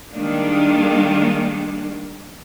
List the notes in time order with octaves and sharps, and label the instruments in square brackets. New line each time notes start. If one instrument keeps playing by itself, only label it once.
[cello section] D#3 G3 G#3 A#3 D4